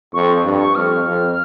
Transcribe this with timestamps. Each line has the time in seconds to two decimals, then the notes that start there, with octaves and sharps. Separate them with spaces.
0.14 F2 C#6
0.44 G2
0.55 C#6
0.75 F2 F6
1.06 F2